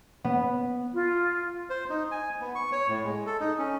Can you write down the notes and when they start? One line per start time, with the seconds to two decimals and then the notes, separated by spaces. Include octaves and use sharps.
0.24 B3
0.93 F4
1.70 C5
1.90 D#4
2.11 G#5
2.41 B3
2.55 C#6
2.72 C#5
2.89 A2
3.04 G#3
3.26 A4
3.40 D#4
3.58 C#4